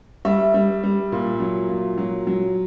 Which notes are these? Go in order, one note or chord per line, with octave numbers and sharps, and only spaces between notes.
G3 E5
G3
G3
A#2
F#3
A#2
F#3
F#3